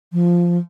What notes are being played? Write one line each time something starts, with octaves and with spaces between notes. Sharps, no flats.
F3